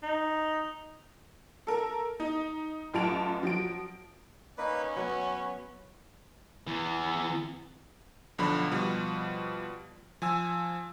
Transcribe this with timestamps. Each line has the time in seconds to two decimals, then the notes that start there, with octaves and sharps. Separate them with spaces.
0.03 D#4
1.67 A4 A#4
2.20 D#4
2.93 A1 F#2 F4 A5 D7 F7
3.43 F3 F#3 D7
4.58 A#3 C#4 D#4 B4
4.96 F#3 B3 F#4 B4
6.67 E2 E3
8.38 B1 D3 F3 B5
8.71 B2 F3 G3
10.22 F3 G#5 E6